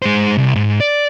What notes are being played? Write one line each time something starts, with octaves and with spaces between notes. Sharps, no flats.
G#3 C5
C2
G#2
D5